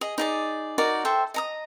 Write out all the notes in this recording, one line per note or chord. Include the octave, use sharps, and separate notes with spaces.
G#4 D#5
D#4 G#4 D5
D#4 F#4 A#4 D5
A4 C5 E5 G5
D#5 A#5 D#6